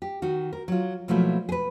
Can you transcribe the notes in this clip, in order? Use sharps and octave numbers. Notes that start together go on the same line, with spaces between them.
G4
D#3 F#4
A#4
F#3 F4
B2 F3 F#3 A3 A#3 E4
G#4 B4